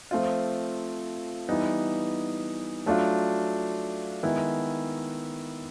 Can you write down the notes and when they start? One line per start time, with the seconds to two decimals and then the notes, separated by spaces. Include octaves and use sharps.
0.11 F3 A3 C4 F4
1.49 E3 G3 B3 D#4
2.86 F#3 A3 D4 F4
4.23 D#3 G#3 B3 E4